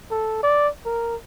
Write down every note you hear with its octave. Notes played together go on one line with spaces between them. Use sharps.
A4
D5
A#4